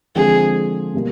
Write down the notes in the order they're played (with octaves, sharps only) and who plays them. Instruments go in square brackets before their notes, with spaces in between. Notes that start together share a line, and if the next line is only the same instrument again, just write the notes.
[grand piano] D3 F3 G#3 C4 [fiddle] G#4
[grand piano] B2 G3 A#3